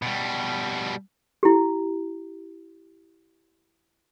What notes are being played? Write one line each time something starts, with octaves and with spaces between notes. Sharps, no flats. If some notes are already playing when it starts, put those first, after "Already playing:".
B2 G3
E4 G4